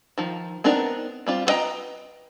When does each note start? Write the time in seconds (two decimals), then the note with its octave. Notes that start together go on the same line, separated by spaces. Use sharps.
0.18 D#3 F3
0.64 B3 C4 D4 D#4 A#4
1.27 G3 C4 F4
1.47 B3 B4 D#5 G5 A#5